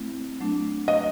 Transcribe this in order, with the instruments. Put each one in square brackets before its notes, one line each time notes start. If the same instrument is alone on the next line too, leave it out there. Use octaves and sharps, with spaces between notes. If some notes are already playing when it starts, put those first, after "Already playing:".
Already playing: [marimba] A3 C4 E4
F#3 A3 D4
[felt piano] D#5